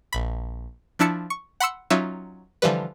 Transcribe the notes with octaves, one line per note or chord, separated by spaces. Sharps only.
A#1 B5
F3 D4 E4 A5 C#7
C#6
F#5 B5 C6 E6 C#7
F#3 C#4 D#4 F4 E5
D3 E3 F3 G3 B4